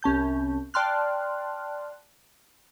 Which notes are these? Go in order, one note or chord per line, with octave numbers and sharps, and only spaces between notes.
C2 C#4 A5 G6
D5 G5 A5 C6 F6 F#6